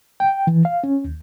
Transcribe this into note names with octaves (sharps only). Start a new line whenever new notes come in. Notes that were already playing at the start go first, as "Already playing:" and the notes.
G5
E3
F5
C#4
D#2